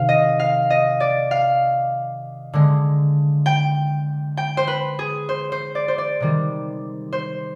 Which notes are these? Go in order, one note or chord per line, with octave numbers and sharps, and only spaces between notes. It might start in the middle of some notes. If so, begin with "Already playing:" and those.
Already playing: C3 D#3 F5
D#5
F5
D#5
D5
F5
D3 G#3
G5
G5
C5
B4
G#4
C5
C5
D5
C5
D5
C3 D#3 G3
C5